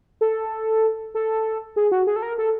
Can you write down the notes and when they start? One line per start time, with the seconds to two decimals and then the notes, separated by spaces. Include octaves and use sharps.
0.21 A4
1.14 A4
1.76 G#4
1.92 F#4
2.07 G#4
2.16 A4
2.22 A#4
2.38 A4